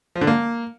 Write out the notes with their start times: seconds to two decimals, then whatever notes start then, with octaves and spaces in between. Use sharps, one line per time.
0.16 F3
0.21 D3
0.27 A#3